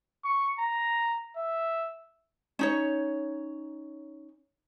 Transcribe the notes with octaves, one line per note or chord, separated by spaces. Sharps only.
C#6
A#5
E5
C#4 D#4 C#5